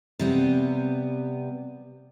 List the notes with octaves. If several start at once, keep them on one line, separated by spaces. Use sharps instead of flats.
C3 G3 B3